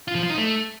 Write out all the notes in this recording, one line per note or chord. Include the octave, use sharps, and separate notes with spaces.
F4
F3
F4
D#4
A3